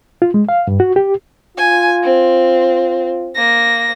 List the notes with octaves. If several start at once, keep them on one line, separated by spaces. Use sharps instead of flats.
F4
G#3
F5
G2
F#4
G4
F4 G#5
C4
A#3 A#6